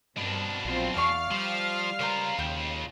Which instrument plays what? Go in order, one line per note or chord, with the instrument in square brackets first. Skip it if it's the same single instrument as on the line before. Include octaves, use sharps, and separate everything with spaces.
[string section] G2 C4 A#4 [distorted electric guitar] B2 D4
[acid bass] A#1 [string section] F#3 C4 F4
[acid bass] E2 [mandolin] D5 C#6 [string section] F5 F6 C7
[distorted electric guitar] F3 [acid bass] G3
[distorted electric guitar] C#3 F4 [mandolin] A#4 C5 A#5
[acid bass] D#2 [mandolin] C5 F5 G5